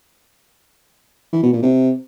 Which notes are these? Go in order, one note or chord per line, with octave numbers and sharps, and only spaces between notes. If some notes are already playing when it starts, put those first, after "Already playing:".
E3
B2
A#2
C3